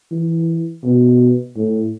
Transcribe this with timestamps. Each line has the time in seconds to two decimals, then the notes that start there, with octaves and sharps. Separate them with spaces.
0.11 E3
0.84 B2
1.56 A2